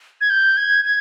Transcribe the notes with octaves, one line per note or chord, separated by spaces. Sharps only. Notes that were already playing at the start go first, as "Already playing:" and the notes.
G#6
G6
G#6
G#6